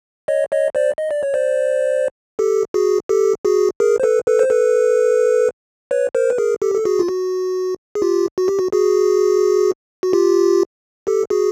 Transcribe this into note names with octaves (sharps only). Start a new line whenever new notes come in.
C#5 D#5
C#5 D#5
C5 D5
D#5
D5
C#5
C5 D5
G4 A4
F#4 G#4
G4 A4
F#4 G#4
G#4 A#4
C5
A4 B4
A4 B4
C5
A4 B4
B4 C#5
A#4 C5
B4
G#4 A#4
G4 A4
A4
F#4 G#4
F4
F#4
G#4
F4 G4
F#4
G4
F#4
F#4 G#4
F#4
F4 G4
G4 A4
F#4 G#4